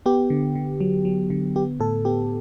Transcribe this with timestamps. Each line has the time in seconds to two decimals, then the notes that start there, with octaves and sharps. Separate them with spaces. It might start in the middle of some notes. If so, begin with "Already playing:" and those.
0.06 B3 G4
0.30 D3
0.55 D3
0.80 F#3
1.05 F#3
1.30 D3
1.56 B3 G4
1.80 A2 A4
2.05 B3 G4